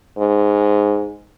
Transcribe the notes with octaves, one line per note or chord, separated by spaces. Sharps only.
G#2